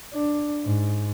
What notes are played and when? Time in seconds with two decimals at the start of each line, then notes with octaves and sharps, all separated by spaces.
0.14 D4
0.65 G#2